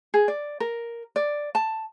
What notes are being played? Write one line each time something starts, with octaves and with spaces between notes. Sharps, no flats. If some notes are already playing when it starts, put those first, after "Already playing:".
G#4
D5
A#4
D5
A5